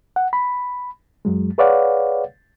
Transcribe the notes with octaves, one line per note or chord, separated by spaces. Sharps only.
F#5
B5
F#2 F#3 G#3
G#4 B4 C#5 D5 F5 F#5